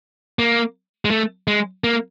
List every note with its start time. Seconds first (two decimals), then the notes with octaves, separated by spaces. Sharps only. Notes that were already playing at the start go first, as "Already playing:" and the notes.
0.39 A#3
1.05 G#3
1.11 A3
1.47 G#3
1.84 A#3